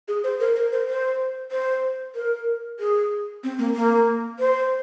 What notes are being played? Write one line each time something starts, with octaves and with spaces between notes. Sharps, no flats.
G#4
C5
A#4
A#4
C5
C5
C5
A#4
G#4
C4
A#3
A#3
C5